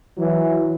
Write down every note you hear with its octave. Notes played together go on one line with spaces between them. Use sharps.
E3 F#3